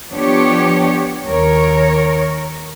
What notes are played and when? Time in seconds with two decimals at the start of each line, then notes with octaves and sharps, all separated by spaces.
0.10 F3 B3 D4 G4 C#5
1.27 D#2 A#4 C#5